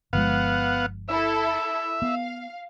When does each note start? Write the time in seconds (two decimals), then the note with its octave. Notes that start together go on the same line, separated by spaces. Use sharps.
0.13 G1 F3 G#3 B3 F5 F#5
1.09 E4 A4 E5
2.02 B3 F5